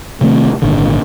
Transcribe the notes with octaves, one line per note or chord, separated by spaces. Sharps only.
C3 D#3 A3 C4
G#1 A#2 D3